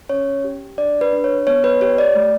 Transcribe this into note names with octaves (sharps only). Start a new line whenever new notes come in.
C#4 C#5
G4
D4 D5
B4
D4
C#5
B3 C#5
B4
G4 C#5
D5
A3